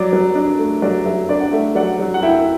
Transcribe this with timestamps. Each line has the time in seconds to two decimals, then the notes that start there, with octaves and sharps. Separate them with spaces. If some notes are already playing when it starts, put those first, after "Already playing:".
Already playing: F#3 D5
0.13 F#3
0.35 D4
0.59 A3
0.82 F#3 D5
1.05 F#3 E5
1.29 D4 D5
1.40 F#5
1.52 A3 E5
1.75 F#3 D5 F#5
1.99 F#3
2.14 F#5
2.22 E4 E5 G5